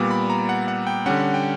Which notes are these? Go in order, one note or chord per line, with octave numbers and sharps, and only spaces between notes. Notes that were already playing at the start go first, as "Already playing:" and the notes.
Already playing: A#2 G3 B3 D6
B5
A#5
F#5
F#5
G5
D3 G3 C#4 F#5
F#5
G5